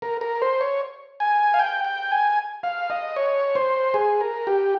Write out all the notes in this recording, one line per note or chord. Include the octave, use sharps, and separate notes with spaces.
A#4
A#4
C5
C#5
G#5
F5
G5
G5
G#5
F5
D#5
C#5
C5
G#4
A#4
G4